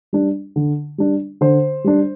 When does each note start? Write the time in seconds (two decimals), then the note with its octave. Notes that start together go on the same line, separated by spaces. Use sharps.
0.13 G3 D4
0.56 D3
0.98 G3 D4
1.41 D3 C5
1.84 G3 D4